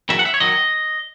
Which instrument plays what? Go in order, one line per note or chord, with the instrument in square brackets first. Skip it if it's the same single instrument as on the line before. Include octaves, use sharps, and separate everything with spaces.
[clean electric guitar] E2 D#3 F#3 E5
F#5
E5
C#5
D#3 F#3 D#5